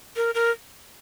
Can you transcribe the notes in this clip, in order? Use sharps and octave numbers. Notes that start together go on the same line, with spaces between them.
A#4
A#4